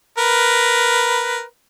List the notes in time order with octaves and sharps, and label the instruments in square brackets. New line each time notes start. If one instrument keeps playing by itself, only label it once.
[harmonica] A#4 B4